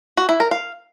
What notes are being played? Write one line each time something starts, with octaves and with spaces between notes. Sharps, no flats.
F#4
E4
A#4
F5